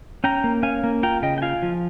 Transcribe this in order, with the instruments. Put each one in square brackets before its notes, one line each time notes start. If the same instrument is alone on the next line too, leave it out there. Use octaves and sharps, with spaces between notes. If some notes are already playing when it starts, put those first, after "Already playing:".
[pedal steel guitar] C#4 G5 A#5
A#3
C#4 F5 G#5
A#3
F4 G5 A#5
C#3 D#5 G5
G5
F4 F5 G#5
F3